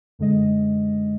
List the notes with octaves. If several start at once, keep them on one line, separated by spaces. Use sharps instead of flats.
F#2 D3 G#3 D#5